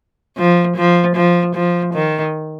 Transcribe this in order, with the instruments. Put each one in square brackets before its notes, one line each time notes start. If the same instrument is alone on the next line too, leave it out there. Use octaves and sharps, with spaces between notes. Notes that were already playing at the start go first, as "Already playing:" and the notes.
[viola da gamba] F3
F3
F3
F3
D#3